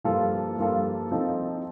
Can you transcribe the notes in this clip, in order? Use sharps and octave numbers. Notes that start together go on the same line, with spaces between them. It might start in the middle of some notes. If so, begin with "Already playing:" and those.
G2 F3 A#3 F4 A4
G2 F3 A#3 F4 A4
F3 C4 D#4 A4